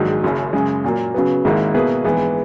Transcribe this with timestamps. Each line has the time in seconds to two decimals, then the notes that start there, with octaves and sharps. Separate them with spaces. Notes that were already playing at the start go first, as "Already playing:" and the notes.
Already playing: A#1 G#2 D#3 F#3
0.24 F#1 F#2 C#3
0.53 F#2 C#3 G#3
0.84 A#2 F#3 A#3
1.14 C#3 F#3 B3
1.45 G#1 G#2 D#3 A#3 E4
1.74 B2 A#3 E4 G#4 B4
2.04 A#1 G#2 E3 B3